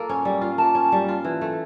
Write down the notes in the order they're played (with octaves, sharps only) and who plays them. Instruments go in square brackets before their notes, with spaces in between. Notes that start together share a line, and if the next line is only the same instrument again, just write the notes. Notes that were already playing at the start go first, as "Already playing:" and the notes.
Already playing: [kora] A#3 F4 A4
C#4
G3
F4
[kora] A#3 [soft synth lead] A5
[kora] C#4
G3
F4
E3
A3